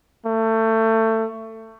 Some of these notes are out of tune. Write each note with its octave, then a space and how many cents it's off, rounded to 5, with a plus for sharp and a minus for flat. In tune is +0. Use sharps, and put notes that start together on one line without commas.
A3 +25